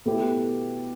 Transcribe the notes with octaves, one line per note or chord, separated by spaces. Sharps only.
B2 A3 E4 G4